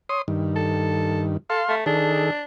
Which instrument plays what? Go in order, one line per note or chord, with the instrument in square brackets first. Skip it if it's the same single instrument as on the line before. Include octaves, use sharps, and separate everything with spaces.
[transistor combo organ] C#5 C6 D#6
G2 D#3
[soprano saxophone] A4
[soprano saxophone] A4 [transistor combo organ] F5 C6
[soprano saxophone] A3
[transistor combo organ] D#3 G#4 A4 [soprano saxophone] D4